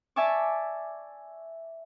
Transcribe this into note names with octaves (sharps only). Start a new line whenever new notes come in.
D5 E5 G#5 A5 C#6 D6